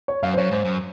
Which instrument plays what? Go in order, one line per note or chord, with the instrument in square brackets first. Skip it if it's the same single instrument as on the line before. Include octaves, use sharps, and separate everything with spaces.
[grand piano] C#5
[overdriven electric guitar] F#2 [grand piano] F5
[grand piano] C5
[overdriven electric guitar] F#2 [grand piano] C#5
[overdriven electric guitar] G#2 [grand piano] C5
[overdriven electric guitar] F#2